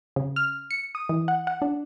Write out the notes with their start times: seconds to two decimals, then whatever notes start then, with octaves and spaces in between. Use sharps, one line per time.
0.16 C#3
0.36 F6
0.71 C#7
0.95 D#6
1.09 E3
1.28 F#5
1.47 F#5
1.62 D4